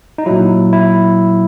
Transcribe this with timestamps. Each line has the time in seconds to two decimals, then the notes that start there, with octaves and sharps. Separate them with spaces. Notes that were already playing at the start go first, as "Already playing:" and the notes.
0.18 D#4
0.26 A#2 F#3 E4
0.73 E4